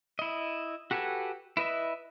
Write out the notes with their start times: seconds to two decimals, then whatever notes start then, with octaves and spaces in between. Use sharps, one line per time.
0.19 E4 D#5
0.91 F#4 G4 A4 B4 G#5
1.57 E4 B4 D#5 E5